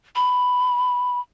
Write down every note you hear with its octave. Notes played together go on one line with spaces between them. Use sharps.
B5